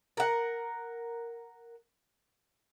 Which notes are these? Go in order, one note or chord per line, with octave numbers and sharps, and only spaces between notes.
A#4 F#5